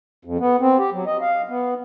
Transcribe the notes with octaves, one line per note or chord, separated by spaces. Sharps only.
F2
B3
C4
G4
F#3
D#5
F5
B3